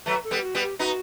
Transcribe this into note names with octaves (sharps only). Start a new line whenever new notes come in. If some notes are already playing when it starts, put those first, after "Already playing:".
F#3 A3 B4
A4
G3 B3
G4
F#4
G3 B3
G4
B3 D#4 F#4